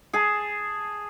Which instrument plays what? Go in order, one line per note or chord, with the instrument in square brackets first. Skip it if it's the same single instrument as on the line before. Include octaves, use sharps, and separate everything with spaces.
[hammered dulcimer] G#4 A5